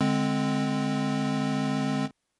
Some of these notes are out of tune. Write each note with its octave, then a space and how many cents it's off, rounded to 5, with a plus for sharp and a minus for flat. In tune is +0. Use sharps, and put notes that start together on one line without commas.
D3 +0 G#3 +0 C4 +0